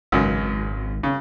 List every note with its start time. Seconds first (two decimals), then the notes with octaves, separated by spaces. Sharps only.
0.12 G#1 C#2 F#2
1.03 C#3 F#3